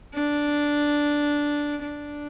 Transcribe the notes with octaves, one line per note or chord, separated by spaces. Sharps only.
D4
D4